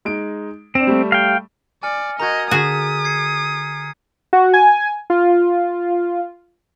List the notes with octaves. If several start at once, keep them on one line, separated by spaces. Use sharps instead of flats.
G#3 D#4 D7
C4 D4 E7
G3 A3
F5 G5
D5 G#5 F6 C#7
F#4 A#4 D#5 A#5 G6 G#6
D3 F#4 G#4 C#6 D#6 F#6 A6 B6
G#6 C7 C#7
F#4
G#5
F4